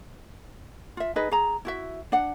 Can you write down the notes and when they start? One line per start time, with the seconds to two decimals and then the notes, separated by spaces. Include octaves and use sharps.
0.97 F4 E5
1.16 D#4 G#4 B4 D#5
1.31 G#4 A#5
1.65 E4 F#4 E5
2.12 D4 F#5